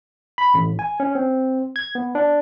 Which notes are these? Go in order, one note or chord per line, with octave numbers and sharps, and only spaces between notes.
B5
A1
G#5
C#4
C4
G#6
B3
D4